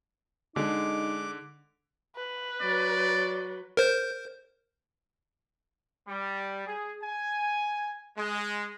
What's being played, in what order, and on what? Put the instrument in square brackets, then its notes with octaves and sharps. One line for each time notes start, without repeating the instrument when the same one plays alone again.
[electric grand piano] D3 [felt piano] G#3 [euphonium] D#4 [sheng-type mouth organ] D6
[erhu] B4
[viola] F#3 [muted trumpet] D5
[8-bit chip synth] A#4 C5 G6
[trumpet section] G3
G#4
G#5
G#3